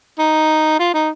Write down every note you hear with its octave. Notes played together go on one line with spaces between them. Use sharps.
D#4
F4
D#4